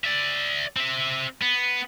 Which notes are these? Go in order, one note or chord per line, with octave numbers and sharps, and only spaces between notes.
D5 E5
C4 E5
B3